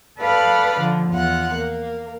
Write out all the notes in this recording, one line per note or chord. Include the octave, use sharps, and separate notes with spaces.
A4 B4 D5 F5 F#5 B5
D3 F3
E2 F4 F#5
A#3